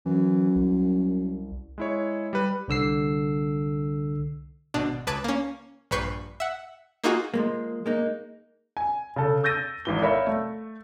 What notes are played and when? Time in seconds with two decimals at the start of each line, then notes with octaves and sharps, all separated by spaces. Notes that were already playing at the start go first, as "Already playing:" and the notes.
0.05 F#2 E3
0.56 C2
1.78 G#3 E4 C#5
2.33 G3 B4
2.68 C2 D3 E6 C7
4.74 G#1 B2 D4
5.07 C#2 B4 A5 D6 F#6 G#6
5.24 A#3 C#4
5.91 A#1 G2 B4 C#6 G6 C7
6.40 E5 F#5
7.04 A#3 D#4 F4 F#4 G#4
7.34 F3 G#3 A#3
7.86 G#3 A#3 D#4
8.77 G#5
9.16 C#3 A4
9.44 E6 G6 A6 A#6 D#7
9.85 G#1 E3 G7
10.02 A#4 C#5 D5 E5 F5 B5
10.27 A3